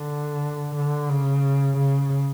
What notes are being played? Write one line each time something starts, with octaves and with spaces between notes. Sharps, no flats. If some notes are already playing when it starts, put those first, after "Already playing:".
Already playing: D3
D3
C#3
C#3